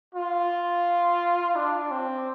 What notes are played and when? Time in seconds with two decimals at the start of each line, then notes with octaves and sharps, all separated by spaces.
0.15 F4
1.56 D4
1.91 C4